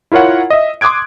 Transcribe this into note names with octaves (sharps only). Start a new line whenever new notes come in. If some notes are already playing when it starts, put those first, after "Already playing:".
E4 F4 A#4 C#5 F#5
D#5 E5
C6 D6 D#6 F#6 G#6 D7